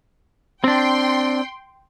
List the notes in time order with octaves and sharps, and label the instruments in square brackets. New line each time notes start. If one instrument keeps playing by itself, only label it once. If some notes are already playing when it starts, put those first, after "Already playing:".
[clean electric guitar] C4 D4 [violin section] G5 C6